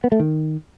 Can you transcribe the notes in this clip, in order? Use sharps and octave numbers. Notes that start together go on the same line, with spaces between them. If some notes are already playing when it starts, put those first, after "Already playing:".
B3
A3
D#3